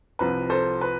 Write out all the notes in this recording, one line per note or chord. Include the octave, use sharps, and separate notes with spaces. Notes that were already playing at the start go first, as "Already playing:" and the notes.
C2 C3 F3 B4
A4 C5
B4